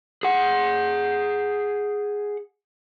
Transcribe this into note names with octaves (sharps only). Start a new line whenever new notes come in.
G#4 F#5